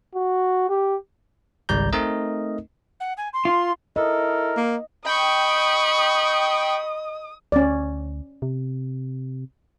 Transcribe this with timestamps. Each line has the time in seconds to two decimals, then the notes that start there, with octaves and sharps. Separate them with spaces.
0.15 F#4
0.69 G4
1.69 G#1 C#2 G3 D5 A#5 G6
1.93 A3 C4 D#4 A#4 D#5
3.00 F#5
3.17 G#5
3.33 C6
3.45 F4
3.96 E4 A4 A#4 D#5
4.57 A#3
5.06 D#5 G5 B5 C#6 D#6
7.52 D2 C#4 D5
8.42 C3